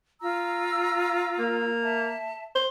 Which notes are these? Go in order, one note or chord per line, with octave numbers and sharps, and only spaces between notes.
F4 A#5 E6
A#3
E5 A5
C5